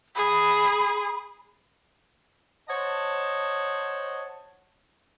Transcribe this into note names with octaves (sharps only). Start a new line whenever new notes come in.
G#4 B5
C5 C#5 D#5 F#5 A5